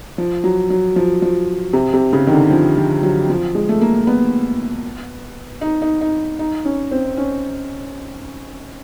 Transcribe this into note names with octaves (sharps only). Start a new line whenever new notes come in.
F3
F#3
F#3
F3
F3
C3
C3
C#3
D#3
D3
F3
F3
F#3
F3
G#3
A3
A#3
B3
D#4
D#4
D#4
D#4
C#4
C4
C#4